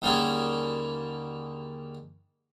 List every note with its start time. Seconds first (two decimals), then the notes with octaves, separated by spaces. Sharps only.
0.02 D#2 D3 G3 A#3 C#4 G#4